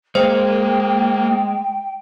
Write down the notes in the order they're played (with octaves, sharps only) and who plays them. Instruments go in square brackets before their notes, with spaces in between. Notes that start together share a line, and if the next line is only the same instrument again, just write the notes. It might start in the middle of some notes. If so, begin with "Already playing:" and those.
[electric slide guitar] G#3 [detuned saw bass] A#3 [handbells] C5 [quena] G5